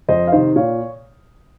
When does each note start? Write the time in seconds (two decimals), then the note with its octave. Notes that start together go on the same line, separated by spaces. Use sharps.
0.08 F2 C5 D#5
0.27 F5
0.32 C3 D#3 C5 D#5
0.56 A#2 C#5 F5